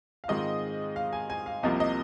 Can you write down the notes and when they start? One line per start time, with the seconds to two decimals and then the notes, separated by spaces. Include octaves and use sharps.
0.24 F5
0.28 G#2 D#3 G#3 C4 F4 D#5
0.96 F5
1.13 G#5
1.30 G#5
1.46 F5
1.63 C2 C3 F3 A#3 D#5
1.80 D#5